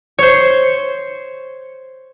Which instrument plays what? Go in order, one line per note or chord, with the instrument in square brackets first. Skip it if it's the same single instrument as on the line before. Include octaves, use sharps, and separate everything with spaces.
[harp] C5 C#5